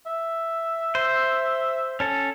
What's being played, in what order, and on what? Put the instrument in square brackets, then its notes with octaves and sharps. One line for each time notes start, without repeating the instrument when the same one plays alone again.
[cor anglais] E5
[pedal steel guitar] C5
C#4 A4